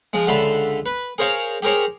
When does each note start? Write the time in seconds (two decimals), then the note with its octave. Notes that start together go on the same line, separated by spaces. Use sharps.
0.13 F3 G#3
0.27 C#2 D3 E5 A5 B5 C6
0.86 B4
1.18 G#4 A#4 C5 C#5 F5
1.62 G4 G#4 A#4 C5 C#5